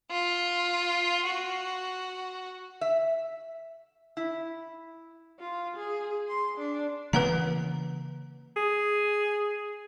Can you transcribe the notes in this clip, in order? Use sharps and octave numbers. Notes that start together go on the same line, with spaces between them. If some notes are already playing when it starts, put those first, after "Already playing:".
F4
F#4
E5
E4
F4
G#4
C6
D4
C#3 E3 A#3 B4 F#5 A#5
G#4